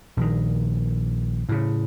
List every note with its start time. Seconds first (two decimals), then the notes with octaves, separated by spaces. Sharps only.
0.17 A#1 D#3
1.49 A2 C#3